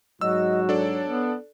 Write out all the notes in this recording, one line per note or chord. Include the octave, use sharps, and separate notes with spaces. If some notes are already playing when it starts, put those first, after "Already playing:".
G#2 F#3 F#4 D#5 E6
D4 A4 C#5 D5
B3